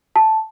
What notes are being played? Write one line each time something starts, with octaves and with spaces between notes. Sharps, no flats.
A5